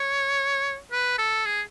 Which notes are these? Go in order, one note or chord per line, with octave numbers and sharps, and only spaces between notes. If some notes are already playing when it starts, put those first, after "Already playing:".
Already playing: C#5
B4
A4
G#4